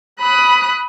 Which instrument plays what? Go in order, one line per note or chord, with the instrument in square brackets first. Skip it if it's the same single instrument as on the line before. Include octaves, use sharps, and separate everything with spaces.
[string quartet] B5 D#6 F#6